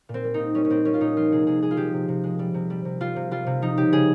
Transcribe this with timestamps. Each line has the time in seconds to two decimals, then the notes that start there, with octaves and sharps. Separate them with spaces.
0.09 A#2
0.14 C4
0.24 G3
0.34 D#4
0.39 A#2
0.55 G3 C#4
0.65 C#4
0.70 A#2 C4
0.85 G3 C#4
0.94 F4
1.00 A#2 D#4
1.16 F3 F4
1.32 C3 G#4
1.47 C3 G#4
1.62 G#3 G#4
1.71 F4
1.77 F3 G4
1.94 C3
2.08 C3
2.24 G#3
2.39 G3
2.54 C3
2.70 G3
2.85 C3
3.01 G3 F4
3.16 C3
3.31 G3 F4
3.47 C3
3.62 F3 D#4
3.77 C#3 G4
3.92 C#3 G#4